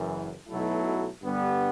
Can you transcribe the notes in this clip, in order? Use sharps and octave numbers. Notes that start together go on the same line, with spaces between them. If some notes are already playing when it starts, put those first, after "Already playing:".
Already playing: F#1 F#2 E3
B1 B2 F#3 A3 E4
G2 D3 G3 B3